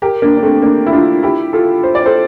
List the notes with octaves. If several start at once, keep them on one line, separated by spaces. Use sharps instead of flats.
G4 A#4
A#3 D4
D4
A3 C4
A#3 D4
E4
D4 F4
E4 G4
F4 A4
C5
D5
A4 C5